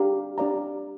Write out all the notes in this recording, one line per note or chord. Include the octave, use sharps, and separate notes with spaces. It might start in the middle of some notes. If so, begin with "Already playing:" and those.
Already playing: D4 G4 D5 F5 A#5
D4 G4 D5 F5 A#5